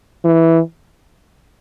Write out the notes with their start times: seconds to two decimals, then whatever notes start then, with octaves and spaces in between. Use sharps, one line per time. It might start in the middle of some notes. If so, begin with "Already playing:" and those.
0.25 E3